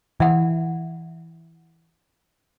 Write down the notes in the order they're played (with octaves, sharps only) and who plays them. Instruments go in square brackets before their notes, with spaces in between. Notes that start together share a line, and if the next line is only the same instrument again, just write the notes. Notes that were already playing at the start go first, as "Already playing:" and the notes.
[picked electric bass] E3 [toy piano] E5 F#5